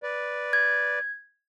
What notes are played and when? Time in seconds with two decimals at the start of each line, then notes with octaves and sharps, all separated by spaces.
0.03 B4 D5
0.53 G#6